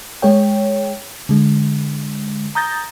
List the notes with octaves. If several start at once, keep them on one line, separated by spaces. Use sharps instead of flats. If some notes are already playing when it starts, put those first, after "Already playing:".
G#3 G#4 C#5 G5
D3 G#3
A#5 D#6 G6 A6 A#6